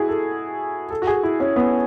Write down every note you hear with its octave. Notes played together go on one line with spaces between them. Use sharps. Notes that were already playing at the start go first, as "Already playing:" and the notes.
Already playing: E4 F#4 G#4
A4
A4
F#4
G#4
E4
C#4
B3